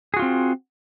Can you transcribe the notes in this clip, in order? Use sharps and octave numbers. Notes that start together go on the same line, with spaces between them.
C4 F4 F#4 G#4